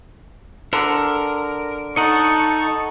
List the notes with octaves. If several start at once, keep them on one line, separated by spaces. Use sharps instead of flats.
D3 A#4
D#4 A4 C#5 D#5 F#5 A5 C#6